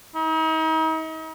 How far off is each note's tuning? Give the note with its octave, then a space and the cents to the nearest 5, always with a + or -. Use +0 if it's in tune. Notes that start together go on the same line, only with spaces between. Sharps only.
D#4 +40